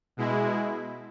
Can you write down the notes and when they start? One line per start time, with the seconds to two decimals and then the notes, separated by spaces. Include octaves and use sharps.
0.17 B2 G#3 E4